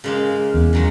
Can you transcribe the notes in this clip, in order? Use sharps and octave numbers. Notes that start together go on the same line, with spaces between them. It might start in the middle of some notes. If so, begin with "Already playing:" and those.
C#3 G#3 A#3
E2
C#3 F#3 G#3